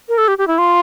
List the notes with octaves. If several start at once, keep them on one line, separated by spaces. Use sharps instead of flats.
A#4
A4
G4
G4
E4
F4